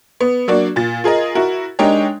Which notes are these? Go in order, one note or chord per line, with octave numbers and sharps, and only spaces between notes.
B3
F#3 A#3 D4 F#4 D5
A#2 A6
F4 G#4 A#4 D#5
E4 F#4 A#4
G#3 D4 D#4 G4 A#4 C#5